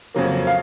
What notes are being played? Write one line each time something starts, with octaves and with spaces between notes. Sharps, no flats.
F2 C#3 F#3 A#3
F5